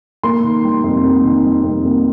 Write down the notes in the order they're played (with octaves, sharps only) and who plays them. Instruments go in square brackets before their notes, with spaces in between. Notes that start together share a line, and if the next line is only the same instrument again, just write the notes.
[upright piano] A#3 C6
D#3
G3
F2
A#3
D#3
G3
F2
A#3